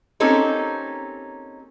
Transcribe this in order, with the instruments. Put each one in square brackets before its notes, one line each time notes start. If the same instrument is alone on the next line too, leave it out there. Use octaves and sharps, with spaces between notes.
[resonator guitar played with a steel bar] A#3 C4 C#4 D#4 G4 A4